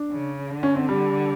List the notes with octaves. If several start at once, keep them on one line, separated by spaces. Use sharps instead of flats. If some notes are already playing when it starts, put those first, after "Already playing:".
Already playing: D4
C#3
D3
C#4
C4
G3